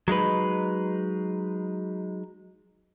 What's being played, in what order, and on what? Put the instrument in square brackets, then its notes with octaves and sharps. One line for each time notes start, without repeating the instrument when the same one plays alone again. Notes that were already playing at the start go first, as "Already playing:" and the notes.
[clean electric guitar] F#3 G#3 D#4 B4